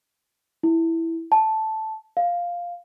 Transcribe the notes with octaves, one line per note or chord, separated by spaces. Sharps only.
E4
A5
F5